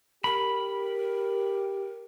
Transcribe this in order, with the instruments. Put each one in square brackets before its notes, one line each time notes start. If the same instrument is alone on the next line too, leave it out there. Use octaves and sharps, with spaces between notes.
[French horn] G4 [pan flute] A#4 [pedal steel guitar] B5